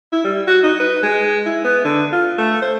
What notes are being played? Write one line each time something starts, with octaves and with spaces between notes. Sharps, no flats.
E4
G3
F#4
D#4
B4
G#3
E4
B3
D3
F4
A3
C5